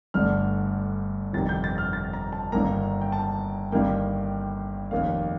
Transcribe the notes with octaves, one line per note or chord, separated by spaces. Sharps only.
G1 G2 D3 A3 F6
G1 F2 C3 D#3 G3 A6
G6
A6
F6
A6
A#5
A5
G1 G2 D#3 A#3 A#5
G5
A5
G1 G2 D#3 G3 A#3 G5
F1 D#2 D#3 A#3 F5